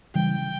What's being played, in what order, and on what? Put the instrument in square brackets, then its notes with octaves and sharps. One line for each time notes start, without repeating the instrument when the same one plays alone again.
[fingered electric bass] C#3 E3 G3 [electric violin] G5